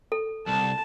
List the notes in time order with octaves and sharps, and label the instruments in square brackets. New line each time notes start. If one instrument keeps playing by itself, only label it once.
[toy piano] A4
[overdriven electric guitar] C2 [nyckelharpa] A5